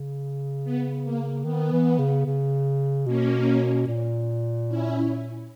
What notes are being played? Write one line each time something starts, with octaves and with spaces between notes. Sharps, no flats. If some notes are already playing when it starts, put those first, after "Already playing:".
Already playing: C#3
B3
A#3
D#3 B3
E3
C#3
C#3
B2 A#3 C#4
A#2
C#4 E4